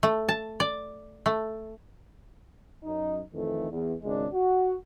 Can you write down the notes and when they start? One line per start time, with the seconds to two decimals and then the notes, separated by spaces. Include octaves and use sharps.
0.03 A3
0.29 A5
0.60 D5
1.26 A3
2.84 F#2 D#4
3.32 F2 D#3 E3 A3
3.70 E2
4.03 G#1 C#3 G#3 D4
4.33 F#4